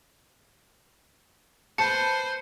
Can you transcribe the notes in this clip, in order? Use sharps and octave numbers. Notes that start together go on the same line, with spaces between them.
B4 C5 A5 C#7